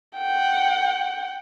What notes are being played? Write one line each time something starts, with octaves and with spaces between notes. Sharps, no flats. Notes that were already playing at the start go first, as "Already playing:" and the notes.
F#5 G5